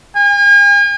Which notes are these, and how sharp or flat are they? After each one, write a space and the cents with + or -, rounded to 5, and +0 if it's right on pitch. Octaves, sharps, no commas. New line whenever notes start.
G#5 -40